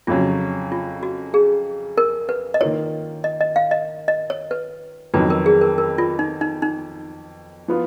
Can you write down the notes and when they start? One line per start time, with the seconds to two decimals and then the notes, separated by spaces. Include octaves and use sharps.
0.07 F2 C#3 F#3 F4
0.72 F4
1.03 F#4
1.34 G#4
1.98 A#4
2.29 B4
2.54 D#5
2.61 D#3 A#3 F4 C#5
3.24 D#5
3.41 D#5
3.56 F5
3.71 D#5
4.08 D#5
4.30 C#5
4.51 B4
5.14 F2 D#3 F#3 B3 B4
5.30 A#4
5.46 G#4
5.61 A#4
5.78 A#4
5.98 F4
6.19 D#4
6.41 D#4
6.62 D#4
7.68 F3 B3 F4